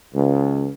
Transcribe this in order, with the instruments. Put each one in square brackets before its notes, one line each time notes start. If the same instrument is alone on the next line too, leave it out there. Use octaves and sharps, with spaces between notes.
[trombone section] C#2